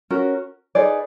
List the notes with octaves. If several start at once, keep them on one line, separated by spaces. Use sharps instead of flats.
C#4 F#4 A#4
D#4 G#4 B4 D5